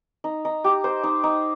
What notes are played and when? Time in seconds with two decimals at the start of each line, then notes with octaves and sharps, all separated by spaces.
0.24 D#4
0.45 D#4
0.64 G4
0.84 C5
1.04 D#4
1.24 D#4